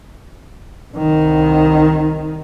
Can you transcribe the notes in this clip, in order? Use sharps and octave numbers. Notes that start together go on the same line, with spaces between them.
C2 D#3